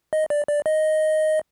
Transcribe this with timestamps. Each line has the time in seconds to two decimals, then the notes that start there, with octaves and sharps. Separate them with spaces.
0.13 D#5
0.30 D5
0.48 D5
0.66 D#5